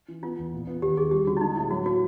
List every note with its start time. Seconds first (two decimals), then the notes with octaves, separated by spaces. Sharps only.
0.08 E3
0.23 B3 F4
0.38 E2
0.53 A#2
0.67 B3
0.82 D#2 G4
0.97 D#3 G#4
1.11 G3 G4
1.27 D3 F#4
1.37 E4
1.41 G#3 D#4
1.56 A2 E4
1.71 F#3 F#4
1.85 A#3 F#4